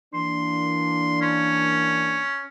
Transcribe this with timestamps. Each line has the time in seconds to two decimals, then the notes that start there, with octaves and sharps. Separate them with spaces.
0.14 E3 A#3 D4 C6
1.21 C#4